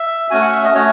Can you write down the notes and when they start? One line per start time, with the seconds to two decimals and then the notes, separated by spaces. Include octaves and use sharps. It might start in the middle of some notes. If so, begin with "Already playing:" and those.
Already playing: E5
0.31 A3 C#4 F#4 G#5
0.41 F#5
0.53 E5
0.64 D#5
0.75 A3 C#4 F#4 C#5